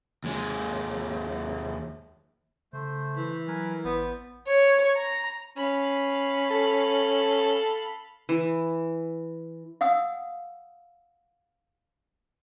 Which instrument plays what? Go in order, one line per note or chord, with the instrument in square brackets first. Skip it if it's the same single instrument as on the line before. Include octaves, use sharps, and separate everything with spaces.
[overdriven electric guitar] D#2 G#3
[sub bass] C#3 [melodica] A3 C5
[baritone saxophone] E3
[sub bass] F#3 [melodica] A#4 B4 G#5
[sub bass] A1 [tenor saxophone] B3 [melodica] C5 D5
[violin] C#5
A#5
[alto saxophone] C#4 [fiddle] F5 B5
[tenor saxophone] A4
[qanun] E3
[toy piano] F5 F#5 D#6 E6